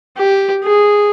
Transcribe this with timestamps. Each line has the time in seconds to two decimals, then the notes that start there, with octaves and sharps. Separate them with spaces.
0.17 G4
0.64 G#4